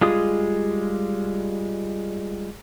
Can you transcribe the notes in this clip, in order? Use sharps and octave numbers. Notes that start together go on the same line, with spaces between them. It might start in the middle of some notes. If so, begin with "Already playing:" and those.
G3 G#3 F4 G#4 D#6